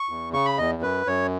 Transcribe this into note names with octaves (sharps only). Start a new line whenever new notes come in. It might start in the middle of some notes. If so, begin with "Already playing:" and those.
Already playing: C#6
E2
C#3 C#6
B5
E2 D#5
F#2 B4
F#2 C#5